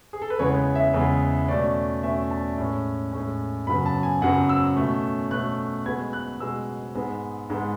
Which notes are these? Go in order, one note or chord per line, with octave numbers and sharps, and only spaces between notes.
G#4
A4
B4
E2 C#3 E3 G#3 B3 C#5
E5
E2 C#3 E3 G#3 B3
B2 A3 C#4 D5
B2 A3 C#4 E5
A5
A2 G#3 C#4
A2 G#3 C#4
F#2 C#3 F#3 B3 B5
A5
G#5
F#2 C#3 F#3 B3 F#5
E6
B2 A3 C#4
B2 A3 C#4 F#6
B2 G#3 B3 G#6
F#6
B2 G#3 B3 E6
G#2 G#3 B3
G#2 G#3 B3